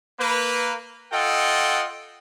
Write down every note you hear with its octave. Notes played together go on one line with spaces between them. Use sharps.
A#3 B4
F4 A4 D#5 F#5 G5